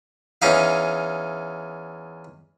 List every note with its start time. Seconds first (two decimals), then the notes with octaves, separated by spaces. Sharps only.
0.42 E2 C#4 D#4 F5